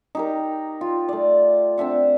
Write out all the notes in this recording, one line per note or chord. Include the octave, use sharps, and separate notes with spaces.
D#4 G4 A#4
F4
A3 D5
C4 D4 E5 F#5